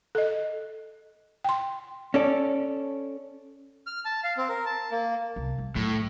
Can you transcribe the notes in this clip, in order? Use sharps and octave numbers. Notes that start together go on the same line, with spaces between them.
A4 D#5
G5 C6
C#4 A4 D5
F6
A5
F5
C4
A#4
A5
A#3
C2
G3
A2 F#3